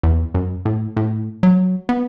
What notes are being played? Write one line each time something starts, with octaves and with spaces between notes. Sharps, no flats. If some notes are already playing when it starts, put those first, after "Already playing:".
E2
F#2
A2
A2
F#3
B3